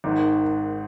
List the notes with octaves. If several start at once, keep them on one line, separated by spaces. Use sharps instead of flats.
G#1 G#2 D#3